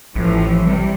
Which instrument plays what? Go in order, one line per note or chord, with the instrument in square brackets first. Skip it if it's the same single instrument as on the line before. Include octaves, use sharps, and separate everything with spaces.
[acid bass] A1 [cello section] A2 E3 F3
[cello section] C3 G3